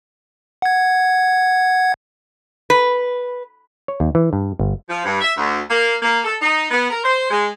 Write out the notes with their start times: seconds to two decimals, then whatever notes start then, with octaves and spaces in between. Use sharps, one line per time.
0.62 F#5 G#6
2.70 B4
3.88 C#5
4.00 D#2
4.15 E3
4.33 G2
4.59 G1
4.90 F3
5.05 G2
5.21 E5
5.37 D2
5.70 A#3
6.03 A#3
6.24 A4
6.41 D#4
6.71 B3
6.91 A#4
7.04 C5
7.31 G#3